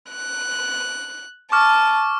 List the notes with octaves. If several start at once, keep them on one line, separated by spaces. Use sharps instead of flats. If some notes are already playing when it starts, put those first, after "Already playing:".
F#6
A5 C#6 D6 F6